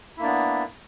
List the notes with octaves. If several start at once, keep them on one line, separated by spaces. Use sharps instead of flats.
A#3 B3 D4 E4